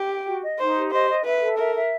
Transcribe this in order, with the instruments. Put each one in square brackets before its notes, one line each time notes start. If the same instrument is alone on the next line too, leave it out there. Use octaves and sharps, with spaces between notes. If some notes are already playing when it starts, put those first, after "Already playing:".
Already playing: [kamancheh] G4
[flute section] G5
F#4
D#5
[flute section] D#4 [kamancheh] C5
[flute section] G4
[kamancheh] C5 [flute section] D#5
[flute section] D#5
[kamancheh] B4 [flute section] E5
[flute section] A4
[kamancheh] A#4 [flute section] E5
[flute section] E5